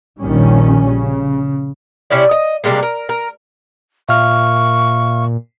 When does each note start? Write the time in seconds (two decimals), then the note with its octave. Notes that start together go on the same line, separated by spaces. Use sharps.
0.21 A#1 D#3 G3 C#4
0.87 C#3
2.10 C3 C#4 E4 D5
2.31 D#5
2.64 C3 G3 G#3 A#3
2.83 A#4
3.09 A#4
4.09 A#2 E5 F5 C#6 F6